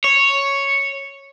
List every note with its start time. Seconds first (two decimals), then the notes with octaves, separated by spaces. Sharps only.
0.04 C#5